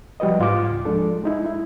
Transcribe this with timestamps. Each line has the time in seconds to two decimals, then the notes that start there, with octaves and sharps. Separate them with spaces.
0.20 F3 G3 F#4 B4 D#5
0.40 G#2 F4 F5 D6
0.71 C#2
0.85 F3 G#3 D4 A4
1.24 G#3 D#4 E4
1.46 E4